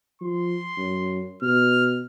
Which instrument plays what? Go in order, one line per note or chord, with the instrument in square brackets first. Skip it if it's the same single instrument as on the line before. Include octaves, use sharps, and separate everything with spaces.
[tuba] F3 [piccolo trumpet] C6
[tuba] F#2
[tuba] B2 [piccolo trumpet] F6